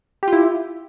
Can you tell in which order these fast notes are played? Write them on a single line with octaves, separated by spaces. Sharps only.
G4 F4 E4